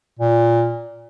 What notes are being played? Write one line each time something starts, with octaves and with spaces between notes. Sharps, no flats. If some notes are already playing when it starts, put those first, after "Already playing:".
A#2